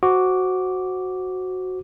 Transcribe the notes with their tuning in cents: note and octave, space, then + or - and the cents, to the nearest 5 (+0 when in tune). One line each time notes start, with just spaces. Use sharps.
F#4 +0 C5 +0 D6 -5